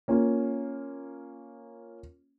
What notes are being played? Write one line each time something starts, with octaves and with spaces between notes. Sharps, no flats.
A#3 C#4 F4